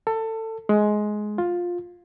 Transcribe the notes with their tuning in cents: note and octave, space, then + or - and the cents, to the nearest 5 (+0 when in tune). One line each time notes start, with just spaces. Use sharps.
A4 +20
G#3 +15
F4 +10